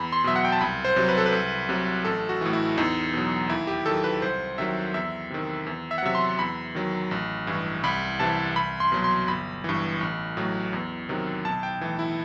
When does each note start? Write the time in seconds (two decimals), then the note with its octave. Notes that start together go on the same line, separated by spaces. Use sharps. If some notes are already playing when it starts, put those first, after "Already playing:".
Already playing: E2 B5
0.13 C6
0.24 B2 F#3 E5
0.36 F#5
0.45 G5
0.52 A5
0.61 C2 B5
0.85 C5
0.96 C3 F#3
1.08 B4
1.18 A4
1.26 B4
1.32 C2
1.69 C3 F#3
2.05 A1 A4
2.29 F#4
2.41 A2 E3
2.53 E4
2.77 E2 D#4
3.14 B2 F#3
3.49 D#2 E4
3.67 G4
3.86 D#3 F#3 A4
4.04 B4
4.22 C2 C5
4.58 C3 D#3 F#3 E5
4.94 E2 E5
5.30 C3 D#3
5.66 E2
5.91 E5
5.98 F#5
6.03 C3 F#3 E5
6.15 C6
6.39 E2 B5
6.75 D#3 F#3
7.11 A1
7.47 G2 E3
7.84 C2 B5
8.20 C3 E3 A5
8.56 C2 B5
8.80 C6
8.92 B2 F#3
9.04 C6
9.28 G1 B5
9.64 G2 E3
10.01 A1
10.37 A2 F#3
10.73 E2
11.09 C3 D#3 F#3
11.45 B1 A5
11.63 G5
11.81 A2 E3
11.99 E4